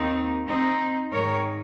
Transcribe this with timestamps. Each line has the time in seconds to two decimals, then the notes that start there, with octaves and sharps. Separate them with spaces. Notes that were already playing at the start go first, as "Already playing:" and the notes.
Already playing: D#2 D#3 C4 D#4
0.48 C4 D#4
1.11 G#2 D#3 A#4 C#5